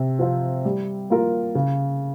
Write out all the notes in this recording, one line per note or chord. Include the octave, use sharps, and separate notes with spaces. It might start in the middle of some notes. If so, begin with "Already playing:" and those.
Already playing: C3
F3 C4 F4
G3
A#3 F4 A#4
C#3